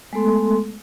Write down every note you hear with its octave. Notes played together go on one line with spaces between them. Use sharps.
G#3 A3 B3 A4 C6